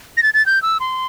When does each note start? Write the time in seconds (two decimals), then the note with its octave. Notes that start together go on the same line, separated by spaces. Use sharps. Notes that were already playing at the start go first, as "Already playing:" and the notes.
0.17 A#6
0.23 A6
0.34 A6
0.46 G6
0.62 E6
0.80 C6